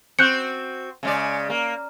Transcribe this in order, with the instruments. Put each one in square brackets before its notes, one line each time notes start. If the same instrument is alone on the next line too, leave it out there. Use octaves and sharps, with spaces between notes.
[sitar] C4 F#4 [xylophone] F#6 G6 C#7
[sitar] C#3 G#3 D5
A#3